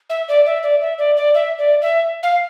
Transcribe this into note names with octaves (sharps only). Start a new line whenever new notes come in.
E5
D5
E5
D5
E5
D5
D5
E5
D5
E5
F5